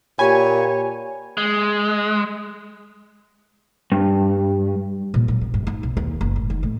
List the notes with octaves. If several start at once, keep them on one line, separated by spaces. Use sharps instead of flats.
A#2 G4 C#5 G5 G#5 B5
G#3
G2
A#2
F#3
C4
G2
D#4
B1
D#2
F#1
A2
D#3
A2